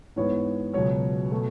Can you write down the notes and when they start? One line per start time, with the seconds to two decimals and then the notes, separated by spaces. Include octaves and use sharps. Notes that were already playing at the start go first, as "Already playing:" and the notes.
0.16 G#2 E3 B3 C#5
0.73 C#2 B2 F#3 C#5
1.31 B2 A3